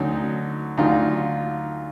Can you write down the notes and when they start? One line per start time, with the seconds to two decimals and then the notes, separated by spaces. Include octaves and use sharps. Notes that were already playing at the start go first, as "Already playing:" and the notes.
Already playing: D2 D3 F#3 C#4 D#4
0.77 D2 D3 F#3 D#4 F4